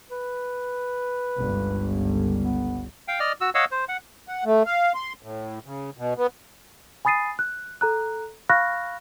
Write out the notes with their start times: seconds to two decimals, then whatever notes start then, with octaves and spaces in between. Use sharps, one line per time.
0.10 B4
1.37 G1 C#2
2.42 B3
3.08 F5 G5
3.20 D5 D#5 F6
3.41 F#4 E6
3.55 C#5 D#5 F5 F#5 E6
3.71 C5
3.89 F#5
4.28 F#5
4.45 A3
4.66 F5
4.95 C6
5.22 A2
5.65 C#3
5.98 B2
6.17 B3
7.05 G#5 B5 D#6 A6 C7 D#7
7.39 F#6
7.81 A4 A#5 F#6
8.49 F5 B5 C#6 F6 F#6 A#6